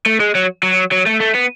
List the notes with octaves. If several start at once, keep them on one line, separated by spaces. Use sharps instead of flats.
A3
G#3
F#3
F#3
F#3
A3
A3
B3